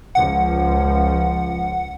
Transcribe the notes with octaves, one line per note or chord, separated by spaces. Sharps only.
C#2 F3 F#5